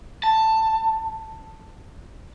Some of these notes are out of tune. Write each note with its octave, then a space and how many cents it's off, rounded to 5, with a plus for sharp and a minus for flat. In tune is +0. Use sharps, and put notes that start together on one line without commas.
A5 +10